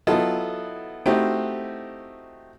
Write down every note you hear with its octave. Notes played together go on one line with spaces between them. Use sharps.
F#3 B3 E4 F4 A4 D#5
A3 C4 D#4 E4 F#4 G4